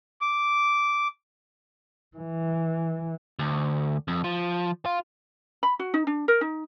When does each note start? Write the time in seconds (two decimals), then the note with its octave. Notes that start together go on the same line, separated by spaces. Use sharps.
0.21 D6
2.17 E3
3.39 D2
4.08 F2
4.24 F3
4.86 F4
5.63 B5
5.79 F#4
5.94 D#4
6.07 D4
6.28 A#4
6.41 D#4